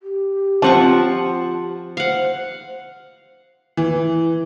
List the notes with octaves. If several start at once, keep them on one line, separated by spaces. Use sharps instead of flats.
G4
F3 C4 F4 F#5 A5 C#6
C5 F5 F#5
E3